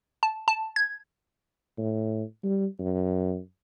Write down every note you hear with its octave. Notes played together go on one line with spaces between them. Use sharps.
A5
A5
G#6
A2
G3
F#2